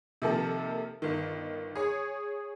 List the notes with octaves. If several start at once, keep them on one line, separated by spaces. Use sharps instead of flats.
C3 D#3 F3 A#3 A4
G1 D#3
G#4 C#5